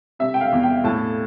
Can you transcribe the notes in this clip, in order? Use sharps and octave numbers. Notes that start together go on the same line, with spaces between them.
C3 E5
G5
F5
E2
G5
A2 A5